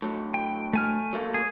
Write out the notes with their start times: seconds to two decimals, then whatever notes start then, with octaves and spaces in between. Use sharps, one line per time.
0.02 A2 F#3
0.34 G5
0.73 A3 G#5 F6
1.13 F#3 A3 A#3
1.34 G#4